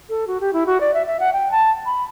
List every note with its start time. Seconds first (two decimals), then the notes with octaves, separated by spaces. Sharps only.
0.09 A4
0.27 F#4
0.41 G4
0.53 E4
0.66 F#4
0.80 D5
0.94 E5
1.07 E5
1.20 F#5
1.33 G5
1.51 A5
1.86 B5